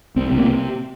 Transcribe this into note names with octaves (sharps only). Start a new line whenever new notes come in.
C2 C4
C3
A#3